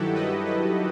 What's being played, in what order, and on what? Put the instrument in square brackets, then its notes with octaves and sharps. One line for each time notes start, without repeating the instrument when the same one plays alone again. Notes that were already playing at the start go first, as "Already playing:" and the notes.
Already playing: [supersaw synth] G2 D#3 F#3 E4 F#4 G4 A4
B4 D#5
B4 D#5